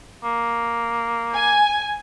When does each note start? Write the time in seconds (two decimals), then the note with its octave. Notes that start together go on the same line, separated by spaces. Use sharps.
0.23 A#3
1.34 G#5